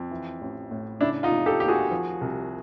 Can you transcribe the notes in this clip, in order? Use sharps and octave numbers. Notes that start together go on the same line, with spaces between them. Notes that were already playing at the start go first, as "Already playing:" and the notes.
Already playing: F2 F3
E3
A1
A2
C#3 D4 E4
D#4 F4
F1
G4 A4
D#2 G4
F#4 G#4
F3
C2